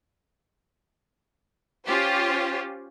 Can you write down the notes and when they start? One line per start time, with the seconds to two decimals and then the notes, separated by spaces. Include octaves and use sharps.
1.86 C#4 F4 G4 C5